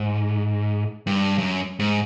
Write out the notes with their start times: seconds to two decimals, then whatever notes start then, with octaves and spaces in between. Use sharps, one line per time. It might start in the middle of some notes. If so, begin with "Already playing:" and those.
Already playing: G#2
1.07 G2
1.38 F#2
1.79 G#2